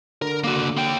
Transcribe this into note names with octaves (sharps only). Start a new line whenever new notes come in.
D3 A#4
A#3 F#4
A#3 G5